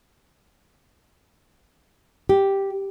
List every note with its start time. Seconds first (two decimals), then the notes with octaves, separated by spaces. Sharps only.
2.29 G4